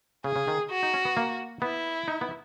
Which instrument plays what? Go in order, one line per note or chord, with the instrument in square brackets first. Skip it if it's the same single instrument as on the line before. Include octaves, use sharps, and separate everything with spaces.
[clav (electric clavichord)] C#3 [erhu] G#4
[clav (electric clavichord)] C#3
D#3
[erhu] F#4
[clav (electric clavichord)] D#4
C#4
B3
A#3
[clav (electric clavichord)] B3 [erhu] E4
[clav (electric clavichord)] D#4
B3